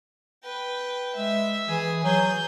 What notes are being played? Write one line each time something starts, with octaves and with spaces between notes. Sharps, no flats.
B4 G5
G#3 E5
E3 G#4
F#3 G#4 G6